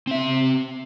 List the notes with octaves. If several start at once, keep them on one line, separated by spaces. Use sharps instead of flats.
C4 E5